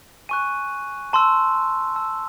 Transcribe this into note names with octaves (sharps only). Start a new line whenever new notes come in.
G#5 C#6 F#6 D#7
A5 C6 E6
A5 C6 E6